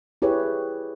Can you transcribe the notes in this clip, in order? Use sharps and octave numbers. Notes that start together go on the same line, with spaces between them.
E4 G4 G#4 B4 C#5